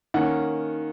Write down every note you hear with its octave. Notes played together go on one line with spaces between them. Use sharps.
D#3 A#3 C#4 F#5